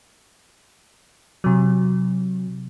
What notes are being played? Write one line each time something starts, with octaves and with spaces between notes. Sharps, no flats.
C3 F#3